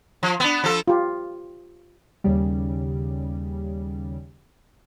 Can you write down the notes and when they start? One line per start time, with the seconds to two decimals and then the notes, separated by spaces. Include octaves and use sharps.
0.23 F3
0.40 B3 D4
0.64 F3 A4
0.88 F4 G4
2.24 D#2 C#3 G3